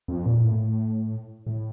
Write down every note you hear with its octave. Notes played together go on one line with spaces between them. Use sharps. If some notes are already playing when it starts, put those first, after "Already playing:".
F2
A#2
A2
A2